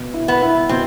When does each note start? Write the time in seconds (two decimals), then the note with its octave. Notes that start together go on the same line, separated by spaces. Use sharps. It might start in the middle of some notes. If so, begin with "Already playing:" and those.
Already playing: B2
0.14 E4
0.28 B3
0.42 E4
0.69 B2 C4